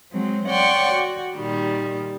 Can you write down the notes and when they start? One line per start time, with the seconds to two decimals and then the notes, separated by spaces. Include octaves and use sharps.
0.12 F#3 G#3 C4
0.50 C#5 D5 F#5 G5 C6 C#6
0.92 F#4
1.35 A#2 D#3 G3